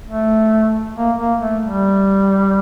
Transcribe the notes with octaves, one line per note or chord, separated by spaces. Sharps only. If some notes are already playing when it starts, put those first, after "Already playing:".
A3
A#3
A#3
A3
G3